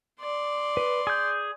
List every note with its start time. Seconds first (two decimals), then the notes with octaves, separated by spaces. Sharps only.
0.20 D5 C6
0.77 B4
1.07 G#4 G6